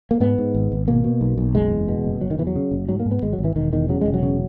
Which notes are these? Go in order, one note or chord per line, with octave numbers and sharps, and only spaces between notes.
A#3
G#2 B3
G#2
G#1
G#1
B2 A#3
B2
B1
B1
F#1 G#3
E2
B2
F#1
F#1 F#3
D#3
E2 E3
F#3
C#3
F#1
G#2 F#3
A#3
G#2
B3
G#1 G#3
F#3
G#1
E3
E1 D#3
E2 D#3
C#3 F#3
E1 G#3
F#3
C#3